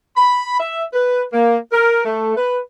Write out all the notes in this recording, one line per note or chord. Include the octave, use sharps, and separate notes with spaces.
B5
E5
B4
A#3
A#4
A3
B4